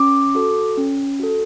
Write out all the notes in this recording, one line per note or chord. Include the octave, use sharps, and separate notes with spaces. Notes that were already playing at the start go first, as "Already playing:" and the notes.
Already playing: C#4 D6
F#4 A4
C#4
F#4 A4